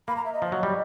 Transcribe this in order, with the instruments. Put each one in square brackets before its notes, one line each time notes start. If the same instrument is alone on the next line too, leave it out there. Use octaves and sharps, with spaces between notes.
[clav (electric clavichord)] A#3 [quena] B5
[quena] A#5
E5
D#5
[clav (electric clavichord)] F3
F#3
G3